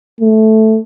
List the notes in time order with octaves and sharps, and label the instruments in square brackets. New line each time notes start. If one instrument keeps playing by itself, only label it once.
[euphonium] A3